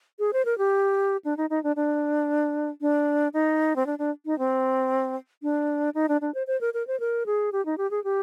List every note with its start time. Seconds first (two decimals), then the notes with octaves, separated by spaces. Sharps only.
0.19 G#4
0.33 C5
0.45 A#4
0.58 G4
1.25 D4
1.37 D#4
1.50 D#4
1.64 D4
1.76 D4
2.81 D4
3.34 D#4
3.76 C4
3.86 D4
3.99 D4
4.26 D#4
4.39 C4
5.43 D4
5.95 D#4
6.09 D4
6.21 D4
6.34 C5
6.47 C5
6.61 A#4
6.74 A#4
6.87 C5
7.00 A#4
7.26 G#4
7.52 G4
7.66 D#4
7.78 G4
7.91 G#4
8.04 G4